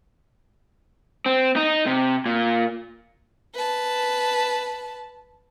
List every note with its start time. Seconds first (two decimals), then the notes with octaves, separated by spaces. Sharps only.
1.26 C4
1.56 D#4
1.86 C3
2.26 A#2
3.54 B4 A5